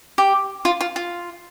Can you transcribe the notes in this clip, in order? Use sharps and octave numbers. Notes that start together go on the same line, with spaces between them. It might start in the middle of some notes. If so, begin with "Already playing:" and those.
G4
F4
F4
F4